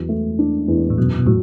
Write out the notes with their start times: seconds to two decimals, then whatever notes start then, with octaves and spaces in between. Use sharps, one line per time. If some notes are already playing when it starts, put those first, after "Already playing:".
Already playing: E2 F#3
0.09 A3
0.39 D4
0.68 E2
0.90 A2
0.98 F#2 B2
1.18 B2
1.27 A2 F#3